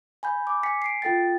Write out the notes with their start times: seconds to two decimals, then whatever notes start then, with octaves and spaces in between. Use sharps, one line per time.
0.23 G#5 B5 G6
0.47 D6
0.63 G#5 B6 C#7
0.82 C7 D7
1.02 F4 A4 G5 A6